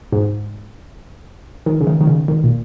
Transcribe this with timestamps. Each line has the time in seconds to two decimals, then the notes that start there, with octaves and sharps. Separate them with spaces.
0.12 G#2
1.66 D#3
1.81 C#3
1.87 D#3
2.01 D#3
2.07 C#3
2.28 D#3
2.44 A#2